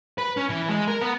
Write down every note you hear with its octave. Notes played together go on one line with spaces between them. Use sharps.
B4
C#4
E3
G#3
A#4
B3